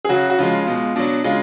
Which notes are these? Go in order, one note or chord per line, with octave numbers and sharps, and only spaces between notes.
G#4
C#3 F#3 F#4
F#4
C#3 F3 G#3 F4
B2 G#3
B2 F#3 D4
C#3 G#3 F4